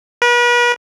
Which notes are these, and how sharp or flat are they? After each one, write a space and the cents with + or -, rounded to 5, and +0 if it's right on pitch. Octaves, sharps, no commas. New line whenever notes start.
B4 -40